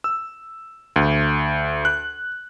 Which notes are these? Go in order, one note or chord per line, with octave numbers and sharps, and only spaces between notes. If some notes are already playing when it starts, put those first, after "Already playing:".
E6
D2
F#6